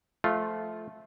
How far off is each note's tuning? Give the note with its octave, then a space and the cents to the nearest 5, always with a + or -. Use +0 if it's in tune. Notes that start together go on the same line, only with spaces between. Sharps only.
F3 -10 A3 -15 F4 +0